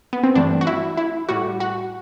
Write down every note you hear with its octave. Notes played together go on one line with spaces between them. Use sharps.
B3
C4
G2 E3 A3 D4
F#4
E4
E4
A2 G3 F#4
F#4